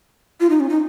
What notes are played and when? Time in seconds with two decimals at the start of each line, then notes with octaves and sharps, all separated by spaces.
0.40 F4
0.50 D#4
0.60 C#4
0.69 D#4